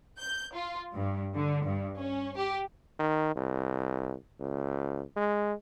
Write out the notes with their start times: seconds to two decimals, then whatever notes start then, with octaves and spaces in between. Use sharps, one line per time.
0.20 G6
0.54 F4
0.93 G2
1.36 D3
1.65 G2
1.99 C#4
2.37 G4
2.99 D#3
3.35 C2
4.40 C#2
5.16 G#3